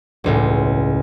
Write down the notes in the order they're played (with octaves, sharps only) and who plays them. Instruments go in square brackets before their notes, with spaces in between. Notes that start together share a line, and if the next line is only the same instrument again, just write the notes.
[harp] E1 C#2 A2